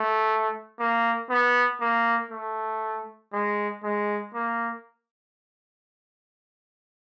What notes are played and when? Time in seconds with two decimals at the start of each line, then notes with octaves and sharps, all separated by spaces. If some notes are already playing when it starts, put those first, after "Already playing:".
Already playing: A3
0.80 A#3
1.30 B3
1.81 A#3
2.31 A3
3.33 G#3
3.84 G#3
4.34 A#3